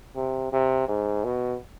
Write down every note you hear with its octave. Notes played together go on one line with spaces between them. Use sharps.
C3
C3
G#2
B2